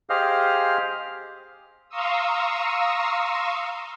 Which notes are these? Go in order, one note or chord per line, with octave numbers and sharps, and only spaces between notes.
G4 G#4 C5 D#5 F5 F6
F5 A#5 C6 C#6 D#6 E6